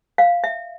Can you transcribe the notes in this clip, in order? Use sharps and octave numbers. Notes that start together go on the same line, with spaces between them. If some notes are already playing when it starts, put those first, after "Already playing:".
F5
E5